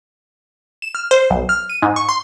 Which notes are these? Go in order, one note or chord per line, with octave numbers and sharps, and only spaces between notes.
E7
F6
C5
B1
F6
D#7
G#2
C#6
C6